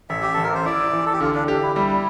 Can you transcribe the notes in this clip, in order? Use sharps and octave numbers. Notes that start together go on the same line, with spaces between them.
A1 E5
G4
A1 A4
A#4
C5
E4 D5
E3
A4
G4
D3 F4
D4
D4 G4
E4
G3 E4